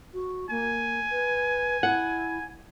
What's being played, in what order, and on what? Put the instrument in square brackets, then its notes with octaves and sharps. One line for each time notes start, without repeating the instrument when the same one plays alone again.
[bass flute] F#4
[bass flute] A#3 [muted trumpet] G#5
[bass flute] B4
[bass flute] E4 [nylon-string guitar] F#5